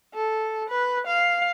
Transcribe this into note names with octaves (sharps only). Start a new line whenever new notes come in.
A4
B4
F5